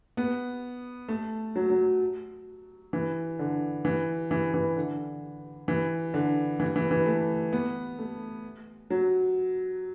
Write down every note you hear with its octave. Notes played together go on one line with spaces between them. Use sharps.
B3
A3
F#3
F#3
E3
D3
E3
E3
E3
D3
E3
D3
E3
E3
E3
A3
B3
A3
F#3